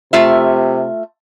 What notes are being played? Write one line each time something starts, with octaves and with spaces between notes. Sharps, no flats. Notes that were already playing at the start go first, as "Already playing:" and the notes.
C3 A3 F4 E5